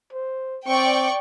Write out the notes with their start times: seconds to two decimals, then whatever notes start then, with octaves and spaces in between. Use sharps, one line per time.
0.13 C5
0.67 C4 D5 G5 C#6